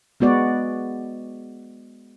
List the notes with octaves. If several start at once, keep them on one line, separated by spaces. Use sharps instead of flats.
G#3 B3 F#4 D5